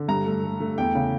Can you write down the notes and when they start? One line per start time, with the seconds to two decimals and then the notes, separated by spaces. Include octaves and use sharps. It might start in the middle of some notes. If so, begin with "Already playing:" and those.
Already playing: D3
0.08 G2 A#5
0.26 A3
0.44 A3
0.60 A3
0.78 E2 G5
0.95 C#3